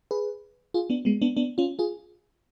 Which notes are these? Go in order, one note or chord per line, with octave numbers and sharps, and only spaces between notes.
G#4 B4
F4 G#4
B3 D4
G#3 B3
B3 D4
B3 D4
C#4 F4
F4 G#4